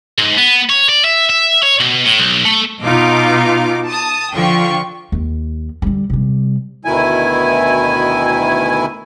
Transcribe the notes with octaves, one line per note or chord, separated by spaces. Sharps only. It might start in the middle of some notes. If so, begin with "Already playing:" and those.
G#2
B3
C#5
D5
E5
E5
C#5
B2
A2
B1
A3
B2 D#4 F4 F5 D6
A5 D#6
D3 F3 F4 G5 C#6
D#2
D3 G3
C3 G3
D2 B2 D#3 E4 G#5